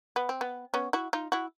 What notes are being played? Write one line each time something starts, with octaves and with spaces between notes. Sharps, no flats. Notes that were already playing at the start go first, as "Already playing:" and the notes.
B3
C4
B3
B3 C#4
E4 F#4
D#4 F4
E4 F#4